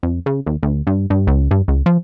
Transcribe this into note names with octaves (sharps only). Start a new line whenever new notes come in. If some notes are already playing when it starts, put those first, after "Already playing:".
F2
C#3
D#2
D2
G2
G2
C#2
G2
C#2
F3